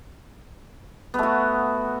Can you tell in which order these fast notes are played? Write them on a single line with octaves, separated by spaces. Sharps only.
B3 A3 F#4